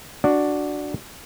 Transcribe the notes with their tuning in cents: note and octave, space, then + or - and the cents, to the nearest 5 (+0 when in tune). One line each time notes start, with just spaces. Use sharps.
D4 +0 F#4 +0 D5 +0